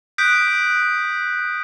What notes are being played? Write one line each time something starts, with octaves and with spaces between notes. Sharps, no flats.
D#6 F#6 G6 B6 D7